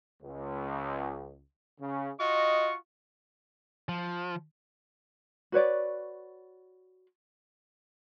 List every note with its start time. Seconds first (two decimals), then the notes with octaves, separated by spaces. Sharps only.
0.22 C#2
1.80 C#3
2.20 F4 F#4 D#5 C#6
3.89 F3
5.52 F#4 B4 C#5 D5